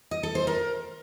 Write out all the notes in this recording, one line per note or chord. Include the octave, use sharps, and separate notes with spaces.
D#5
A4
C5
A#4